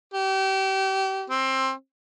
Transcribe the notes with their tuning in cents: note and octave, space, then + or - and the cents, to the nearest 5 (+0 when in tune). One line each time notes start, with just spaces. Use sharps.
G4 -30
C4 +20